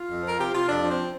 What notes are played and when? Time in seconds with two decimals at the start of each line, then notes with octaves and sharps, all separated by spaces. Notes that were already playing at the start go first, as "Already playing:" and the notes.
Already playing: F4
0.09 F2
0.23 F3 A#4
0.38 C3 G4
0.53 C3 F4
0.67 F2 D4
0.82 F3
0.90 C4